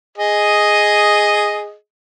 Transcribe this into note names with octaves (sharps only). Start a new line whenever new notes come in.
G#4 D#5